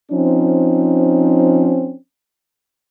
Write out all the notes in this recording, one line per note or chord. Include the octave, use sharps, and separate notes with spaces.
F3 C4 C#4 D#4